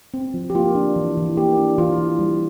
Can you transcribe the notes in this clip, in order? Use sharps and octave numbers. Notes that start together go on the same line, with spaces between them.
C4
F3
G4
A#3 F4
D4
E3
E3
A#3 G4
D4
E3 F4
E3
G3